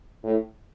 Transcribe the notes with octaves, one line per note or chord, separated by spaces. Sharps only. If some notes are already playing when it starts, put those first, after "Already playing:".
A2